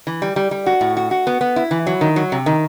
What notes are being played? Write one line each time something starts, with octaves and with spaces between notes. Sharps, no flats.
E3
G3
G3
G3
F#4
A2
F#4
F#4
B3
B3
E4
E3
F#3
D#3
F#3
C3
D#3